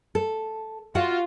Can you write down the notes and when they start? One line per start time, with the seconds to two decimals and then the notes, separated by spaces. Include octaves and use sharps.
0.15 A4
0.95 F4 F#4 F5 F#5